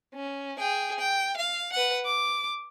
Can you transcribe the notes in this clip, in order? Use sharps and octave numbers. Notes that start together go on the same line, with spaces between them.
C#4
G#4 G5
G5
F5
B4 F#5
D6